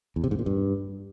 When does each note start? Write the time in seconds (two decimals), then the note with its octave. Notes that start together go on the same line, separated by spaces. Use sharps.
0.16 E2
0.24 C3
0.31 G#2
0.39 A#2
0.46 G2